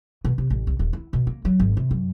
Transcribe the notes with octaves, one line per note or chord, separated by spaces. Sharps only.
B2
C3
A1
C2
D#1
E4
B2
A#3
F#3
G#1
C3
F#2